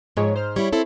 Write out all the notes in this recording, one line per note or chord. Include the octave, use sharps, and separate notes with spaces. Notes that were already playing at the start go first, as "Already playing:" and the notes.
G#2 F3 G#3 C#5
C5 F6
G3 E4 C#5
C4 E4 A4